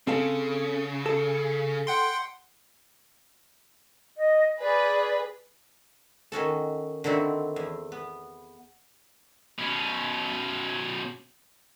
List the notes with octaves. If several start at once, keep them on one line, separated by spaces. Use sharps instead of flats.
C#3 C4 A4 F5
A4
F#5 G5 C6
D#5
G#4 B4 D5
D#3 C#4 F#4 A4
D3 D#3 C4 E4 F#4
E2
B3
B2 C#4